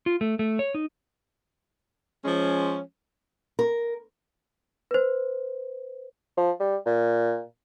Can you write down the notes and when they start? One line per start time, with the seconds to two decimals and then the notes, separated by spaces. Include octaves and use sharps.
0.06 F4
0.21 A3
0.39 A3
0.59 C#5
0.74 D#4
2.25 F3 G#3 C#4
3.59 A#4
4.91 B4 C5
6.37 F3
6.60 G3
6.86 A#2